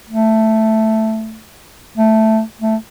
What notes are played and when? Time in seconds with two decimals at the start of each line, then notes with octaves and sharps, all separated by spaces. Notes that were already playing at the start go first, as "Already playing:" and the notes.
0.09 A3
1.98 A3
2.62 A3